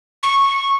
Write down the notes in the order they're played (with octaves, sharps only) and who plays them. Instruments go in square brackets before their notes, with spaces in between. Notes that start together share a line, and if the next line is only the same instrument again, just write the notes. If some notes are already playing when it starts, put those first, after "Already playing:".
[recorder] C#6